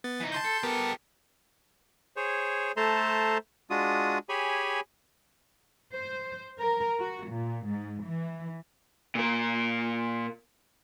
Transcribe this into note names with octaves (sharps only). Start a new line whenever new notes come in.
B3 A6
E3 D#4
A5 C6 G6
A4
B3 G4 A4 A#4 A5
G#4 C5 C#5
A3 A4 C5 A5 A#5 C6
G#3 D4 F4 F#4 D#6
G4 G#4 C#5 G#5 B5
C5
A#4
F#4
A#2
G#2
E3
A#2 A#4